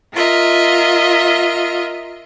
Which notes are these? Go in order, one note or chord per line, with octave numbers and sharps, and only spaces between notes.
F4 A#4 D#5 E5